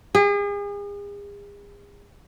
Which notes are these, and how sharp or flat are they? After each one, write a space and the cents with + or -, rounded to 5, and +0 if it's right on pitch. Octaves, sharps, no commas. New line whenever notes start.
G#4 -40